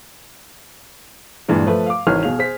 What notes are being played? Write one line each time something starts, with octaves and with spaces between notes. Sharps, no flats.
G2 A#2 E3 G#3
F3 A3 B4
F5 D6
G#1 D#3 E3 C#5 F6
B2 G#4 F5 F7
G#4 C5 B6